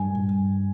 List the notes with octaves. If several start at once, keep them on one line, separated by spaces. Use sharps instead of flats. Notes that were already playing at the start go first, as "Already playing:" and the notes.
Already playing: G2 G#5
G2